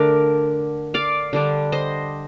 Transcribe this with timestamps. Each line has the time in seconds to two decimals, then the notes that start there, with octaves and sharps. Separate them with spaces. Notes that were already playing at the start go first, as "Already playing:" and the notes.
Already playing: D3 A3 D4 A#4 D5
0.94 D5 F5
1.33 D3 G3 D4
1.72 C5 D#5